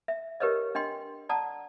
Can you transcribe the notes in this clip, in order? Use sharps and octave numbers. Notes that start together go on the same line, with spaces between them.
E5
G4 A#4 B4 C#5 D#5
D4 D#5 G5 C6
D5 F#5 A5 A#5 D#6